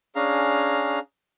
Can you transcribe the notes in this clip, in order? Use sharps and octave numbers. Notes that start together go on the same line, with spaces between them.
C#4 D4 G#4 F5 A#5